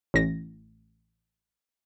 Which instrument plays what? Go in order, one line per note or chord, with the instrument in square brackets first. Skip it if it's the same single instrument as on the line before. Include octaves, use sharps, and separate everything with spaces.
[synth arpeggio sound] A1 A#6